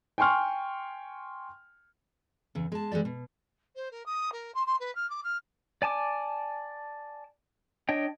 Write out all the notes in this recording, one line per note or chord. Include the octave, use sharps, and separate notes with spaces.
G5 G#5 C6 C#6 F6
E2 C#3
G#3 A5
E3 G#3 A#3 G4 D5
B2
C5
A#4
D#6
A#4
C6
C6
B4
F6
D6
F6
D5 G#5 A5 D6
D4 C#5 D#5 G5